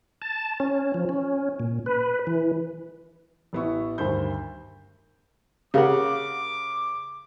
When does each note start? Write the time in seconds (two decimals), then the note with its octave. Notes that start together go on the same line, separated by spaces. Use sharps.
0.22 A5
0.60 C#4
0.94 F3
1.09 C#4
1.60 A#2
1.86 B4
2.27 E3
3.53 A1 B3 E4 C#6
3.98 D2 G2 D#3 C5 B5 G6
5.74 C#3 G4 G#4 A#4 F5 F#5 D6